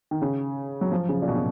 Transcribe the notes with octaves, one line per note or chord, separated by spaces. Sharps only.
D#3
C#3
F#3
F3
C#3
A#2
B2
C#3